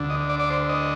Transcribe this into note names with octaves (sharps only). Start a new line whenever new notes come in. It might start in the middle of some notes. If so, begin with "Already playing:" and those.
Already playing: D2 D3
D#5
D5
D5
C5
D#5